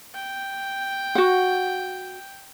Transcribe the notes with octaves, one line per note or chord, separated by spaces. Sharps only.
G5
F#4 F#5